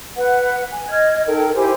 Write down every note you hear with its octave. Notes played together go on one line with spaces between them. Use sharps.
B4 F#5
G#5
D#5 F6 G#6
D#4 A4 A#4 G5
E4 G4 C5 G#5